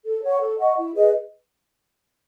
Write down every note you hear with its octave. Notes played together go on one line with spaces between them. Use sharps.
A4
C#5 F#5 C#6
A4
D#5 F#5 C#6
E4
G#4 B4 D#5